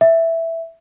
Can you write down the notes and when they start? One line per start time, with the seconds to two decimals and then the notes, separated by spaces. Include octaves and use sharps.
0.01 E5